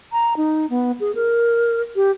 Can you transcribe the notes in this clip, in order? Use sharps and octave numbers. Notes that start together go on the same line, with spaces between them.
A#5
D#4
B3
G#4
A#4
G4